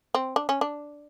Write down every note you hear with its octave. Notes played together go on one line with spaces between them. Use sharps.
C4
D4
C#4
D4